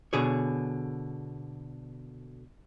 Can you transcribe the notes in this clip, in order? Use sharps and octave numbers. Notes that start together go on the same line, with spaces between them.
B2 D3 G#4 C#5